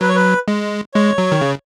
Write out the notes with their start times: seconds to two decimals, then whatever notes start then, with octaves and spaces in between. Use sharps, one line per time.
0.01 F#3 B4
0.08 C#5
0.16 B4
0.48 G#3
0.94 G#3 C#5
1.18 F#3
1.32 D#3
1.41 C#3